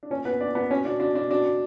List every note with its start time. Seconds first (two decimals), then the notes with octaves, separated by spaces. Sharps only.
0.03 D4
0.10 A#2 C#4
0.25 A#2 B3 B4
0.41 A#2 D4 D5
0.55 A#2 B3 B4
0.71 B2 C#4
0.85 B2 D4
1.00 B2 D4
1.15 B2 D4
1.31 B2 D4
1.45 B2